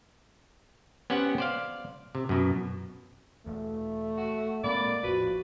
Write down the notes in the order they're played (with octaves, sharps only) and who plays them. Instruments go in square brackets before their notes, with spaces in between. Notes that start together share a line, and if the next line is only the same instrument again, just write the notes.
[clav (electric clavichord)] B3 C#4 G4 C5 F#5
C5 D5 F5
C3
F#2 B2
[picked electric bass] E1 E2 [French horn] A3
[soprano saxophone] F#4
[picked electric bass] A#2 G#3 C4 [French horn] A#3 [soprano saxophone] D5 [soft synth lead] B5
[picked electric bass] A1 E2 [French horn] F3 [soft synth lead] F#4 [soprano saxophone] B4